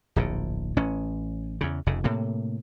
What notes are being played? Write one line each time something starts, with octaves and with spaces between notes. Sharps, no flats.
D1 A#1 A#2
A1 C#4
E2 C#3
F1 F2 C#3
A2 C3 A#3